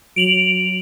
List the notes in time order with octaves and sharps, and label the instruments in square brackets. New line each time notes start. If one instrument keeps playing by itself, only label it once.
[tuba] F#3 [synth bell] D7 F7 F#7